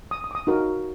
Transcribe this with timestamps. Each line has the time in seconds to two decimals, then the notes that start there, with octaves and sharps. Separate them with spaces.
0.11 D#6
0.24 D#6
0.31 D6
0.35 D#6
0.47 D#4 F#4 A#4